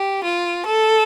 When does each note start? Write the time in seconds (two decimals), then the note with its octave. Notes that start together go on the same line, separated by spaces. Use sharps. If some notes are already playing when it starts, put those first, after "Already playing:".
Already playing: G4
0.24 F4
0.65 A4